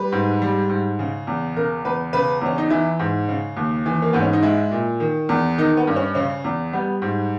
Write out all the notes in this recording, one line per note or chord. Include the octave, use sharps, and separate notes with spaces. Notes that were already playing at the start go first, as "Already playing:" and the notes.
Already playing: G3 B4
G#2
G3
G#2
C#3
E2
C#3 A#4
E2 B4
C#3 B4
E2 C#4
D#4
E3 E4
G#2
C#3
D#2
E3
A#3
G#2 B3
C#4
D#4
G#3 E4
A#2
D#3
E2
D#3 D#4
B3
G2
C#4
C#3 C#4
E2
G3 B3
G#2